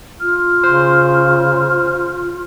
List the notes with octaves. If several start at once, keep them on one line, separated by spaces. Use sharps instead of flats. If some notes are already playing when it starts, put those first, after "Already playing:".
F4 F6
C#3 C5